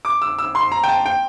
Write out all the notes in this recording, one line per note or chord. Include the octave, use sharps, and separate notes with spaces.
D6
E6
E6
C6
A#5
G5
A5
G5